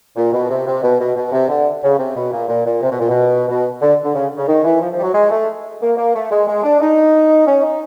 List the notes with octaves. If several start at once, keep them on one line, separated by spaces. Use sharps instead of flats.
A#2
B2
C3
C3
B2
B2
B2
C3
D3
C#3
C3
B2
A#2
A#2
A#2
C3
B2
A#2
B2
B2
D3
D3
C#3
C#3
D#3
E3
F3
F3
G3
F#3
G#3
A3
A#3
A#3
A3
G#3
G#3
D4
D#4
C#4
D#4